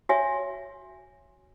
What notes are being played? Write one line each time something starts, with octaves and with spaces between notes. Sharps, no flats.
F#4 C#5 E5 G#5